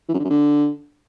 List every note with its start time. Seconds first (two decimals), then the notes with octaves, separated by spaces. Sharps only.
0.09 E3
0.14 F#2
0.19 D3
0.25 F#2
0.30 D3